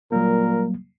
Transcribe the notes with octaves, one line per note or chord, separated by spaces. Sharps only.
A#2 F#3 G3 A#3 A#4